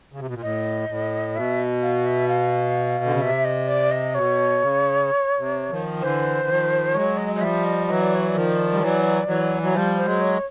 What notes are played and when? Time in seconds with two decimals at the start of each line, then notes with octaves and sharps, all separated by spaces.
0.13 C#3
0.19 C3
0.27 B2
0.35 A#2
0.42 A2 D#5
0.89 A2
1.35 B2 E5
1.82 F5
2.06 E5
2.28 F5
3.04 D3
3.12 C#3
3.21 C3 E5
3.45 D#5
3.68 D5
3.91 D#5
4.14 B2 C#5
4.62 C#3
5.38 C3
5.70 D#3 F3
6.01 D3 E3 C5
6.48 D#3 F3
6.94 F#3 G#3 C#5
7.17 D#5
7.35 D#5
7.41 F3 G3 E5
7.65 D#5
7.87 E3 F#3 D#5
8.01 D5
8.15 C#5
8.28 D5
8.34 D#3 F3
8.72 G3
8.80 E3 F#3
9.27 E3 F#3
9.63 F#3
9.73 F3 G3 C5
9.98 C5
10.05 F#3 G#3
10.21 C#5